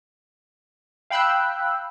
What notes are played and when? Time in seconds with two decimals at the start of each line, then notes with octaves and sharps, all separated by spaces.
1.10 F5 G5 B5 E6 F#6 G6